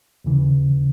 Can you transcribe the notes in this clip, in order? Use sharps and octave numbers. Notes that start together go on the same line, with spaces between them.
D#2 C#3 E3